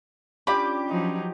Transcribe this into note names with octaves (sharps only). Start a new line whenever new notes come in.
C#4 D4 F4 G4 B5 D6
F3 F#3 D#4